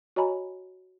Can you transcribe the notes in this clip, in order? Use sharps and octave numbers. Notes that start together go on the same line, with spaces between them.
F#4 C#5 D#5 G#5 A#5 B5